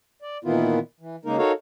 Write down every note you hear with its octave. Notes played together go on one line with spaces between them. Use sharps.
D5
A#2 D#3 E3 B3 E4 F4
E3
C#3 G#3 A#3 D#4 A#4
D#4 F#4 A4 A#4 C#5 F5